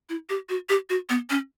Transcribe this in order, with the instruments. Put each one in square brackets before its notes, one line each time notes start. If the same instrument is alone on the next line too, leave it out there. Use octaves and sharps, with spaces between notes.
[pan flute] E4
G4
F#4
G4
F#4
B3
C#4